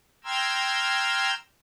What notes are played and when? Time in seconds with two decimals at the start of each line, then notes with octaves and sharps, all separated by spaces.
0.24 G5 A#5 C6 E6 F6 G#6